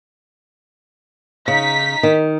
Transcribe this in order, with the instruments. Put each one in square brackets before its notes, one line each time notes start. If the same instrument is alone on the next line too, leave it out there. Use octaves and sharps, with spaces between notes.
[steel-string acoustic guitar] C#3 [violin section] D#4 B6
[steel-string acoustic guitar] D#3